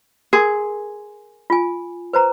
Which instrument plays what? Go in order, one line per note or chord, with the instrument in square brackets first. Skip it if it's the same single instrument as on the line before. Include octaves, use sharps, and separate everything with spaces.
[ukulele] G#4 [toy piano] A#4 C6
[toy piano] F4 G#5
B4 C5 A#5